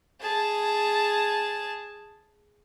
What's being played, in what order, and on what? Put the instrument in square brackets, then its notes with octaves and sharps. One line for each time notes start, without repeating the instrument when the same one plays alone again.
[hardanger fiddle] G#4 A5